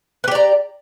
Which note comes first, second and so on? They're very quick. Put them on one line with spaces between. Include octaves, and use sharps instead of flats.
B4 G4 D5 A#5